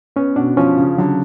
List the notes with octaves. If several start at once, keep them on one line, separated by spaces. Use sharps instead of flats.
B3 C#4
B2 D4
F3 C#4
C#3
D3 F#3